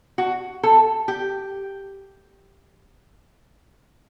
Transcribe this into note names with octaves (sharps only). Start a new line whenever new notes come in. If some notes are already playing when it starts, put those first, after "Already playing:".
F#4
A4
G4